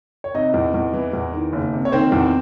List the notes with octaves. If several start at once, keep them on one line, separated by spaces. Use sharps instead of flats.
C#5
C3 D#4 D#5
E2
E2
E3
E2
D#3
F#1
C3
C#5
D#3 C4 C5
E2